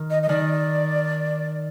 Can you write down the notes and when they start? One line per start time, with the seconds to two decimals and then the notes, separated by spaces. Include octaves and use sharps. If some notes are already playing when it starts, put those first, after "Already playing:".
Already playing: D#3
0.11 D#5
0.23 D#5
0.29 D#3 D5